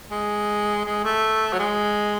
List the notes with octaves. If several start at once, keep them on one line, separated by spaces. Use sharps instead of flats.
G#3
G#3
A3
F#3
G#3